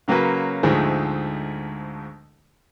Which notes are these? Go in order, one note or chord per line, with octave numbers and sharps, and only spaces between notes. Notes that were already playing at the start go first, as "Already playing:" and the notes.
C#3 F#3 A#3 C#4 F#4 B4
D2 G#2 F3 G#3 A3